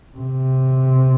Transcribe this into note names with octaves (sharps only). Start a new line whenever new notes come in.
C3